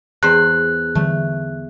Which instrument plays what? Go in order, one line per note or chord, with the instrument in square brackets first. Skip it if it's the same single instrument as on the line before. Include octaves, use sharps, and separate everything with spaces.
[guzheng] E2 C5 [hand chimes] F#6
[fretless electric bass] D3 E3 G3 [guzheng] A3